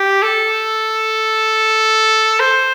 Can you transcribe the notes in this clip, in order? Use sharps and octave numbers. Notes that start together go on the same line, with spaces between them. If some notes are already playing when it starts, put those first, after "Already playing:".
Already playing: G4
A4
C5